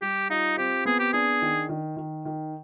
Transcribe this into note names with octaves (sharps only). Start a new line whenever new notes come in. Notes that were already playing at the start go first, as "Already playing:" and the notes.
G3 G4
D#4 F4
C4 G4
B3 G#4
G4
D4 G#4
D#3
D#3
D#3
D#3